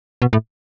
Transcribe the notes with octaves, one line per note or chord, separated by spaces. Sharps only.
B2
A2